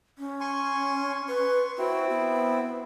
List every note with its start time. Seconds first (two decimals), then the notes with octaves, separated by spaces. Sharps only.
0.18 C#4
0.40 G#5 C6 C#6
1.28 B4 C6 C#6
1.78 C4 E4 F#4
2.10 B3